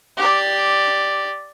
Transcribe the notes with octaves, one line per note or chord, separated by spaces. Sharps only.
G4 D5